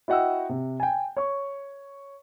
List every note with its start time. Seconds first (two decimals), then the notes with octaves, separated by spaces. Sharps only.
0.08 E4 F#4 D#5 F#5 G5 E6
0.49 C3
0.80 G5 G#5
1.17 C#5 C#6